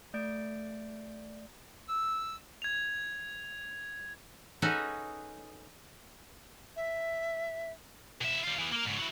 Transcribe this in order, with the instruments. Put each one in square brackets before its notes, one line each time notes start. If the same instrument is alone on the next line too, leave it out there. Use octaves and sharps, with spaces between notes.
[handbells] A3 D5 G6 D7
[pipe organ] E6
[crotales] G#6 F7
[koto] C#4 D#4 F#4 G#4 A4 B4
[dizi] E5
[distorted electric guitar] B2 E5
G3 F4
E3 B3
A#3 A#4
G#2 C#3
F#3 E4